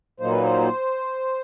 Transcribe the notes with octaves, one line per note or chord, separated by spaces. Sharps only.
A#2 F#3 A#3 D#4 C5
B4
C5